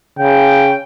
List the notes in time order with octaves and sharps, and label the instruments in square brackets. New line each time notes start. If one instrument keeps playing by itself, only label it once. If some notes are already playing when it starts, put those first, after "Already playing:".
[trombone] C#3 [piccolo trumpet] G5